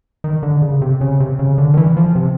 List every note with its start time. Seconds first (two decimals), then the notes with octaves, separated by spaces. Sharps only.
0.24 D#3
0.43 D3
0.62 C#3
0.81 C3
1.01 C#3
1.20 C3
1.39 C#3
1.58 D3
1.74 D#3
1.77 E3
1.97 F3
2.16 C3